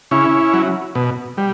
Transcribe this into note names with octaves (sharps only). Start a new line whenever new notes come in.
C#3 C#4 E4
F#3
B2
G3